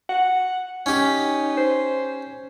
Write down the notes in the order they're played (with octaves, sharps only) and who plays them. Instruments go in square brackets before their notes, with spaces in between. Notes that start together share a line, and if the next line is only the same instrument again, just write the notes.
[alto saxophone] F#5
[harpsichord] C#4 G4 [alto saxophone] D#4
[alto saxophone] C5